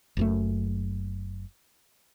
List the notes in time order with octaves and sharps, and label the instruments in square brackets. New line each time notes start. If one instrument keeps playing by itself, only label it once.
[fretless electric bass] F#1 F#2 A3